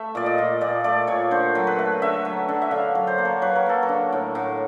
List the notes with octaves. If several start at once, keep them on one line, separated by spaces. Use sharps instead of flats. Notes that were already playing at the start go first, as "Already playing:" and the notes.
Already playing: A3 E5
A#2 D5
D#5
A#2
A#2 D5
A3 D5
A#2 C#5
D3 C5
F#3
B4
A3
D3 E5
F#3
D3
E5
D3 F5
F#3
C5
A#3
C#5
F#3 B4
A#4
A#3 A4
A#4
D3
A2
A2